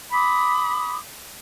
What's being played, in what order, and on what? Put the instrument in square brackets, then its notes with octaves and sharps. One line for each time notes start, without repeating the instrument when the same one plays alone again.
[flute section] B5 C6 D6 D#6